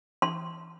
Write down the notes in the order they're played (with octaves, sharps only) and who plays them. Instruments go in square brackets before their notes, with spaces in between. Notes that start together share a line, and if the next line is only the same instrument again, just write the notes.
[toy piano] C6